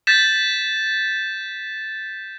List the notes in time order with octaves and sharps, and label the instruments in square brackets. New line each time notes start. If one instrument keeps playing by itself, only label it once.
[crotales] G6 A6 B6 E7